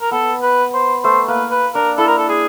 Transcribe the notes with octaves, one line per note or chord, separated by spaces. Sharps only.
A#4
B3 A4
B4
C5
A3 C5
A#3 B4
B4
D4 A#4
E4 A4
A#4
A4
G#4